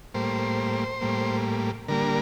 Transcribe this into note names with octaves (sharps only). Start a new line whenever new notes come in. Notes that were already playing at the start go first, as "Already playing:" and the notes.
A2 G3 A#3 C5
A2 G3 A#3
D3 G3 A#3 A#4